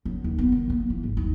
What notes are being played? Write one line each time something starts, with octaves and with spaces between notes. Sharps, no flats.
F#2
D#2
B3
D#3
A#3
E3
G#1
D#2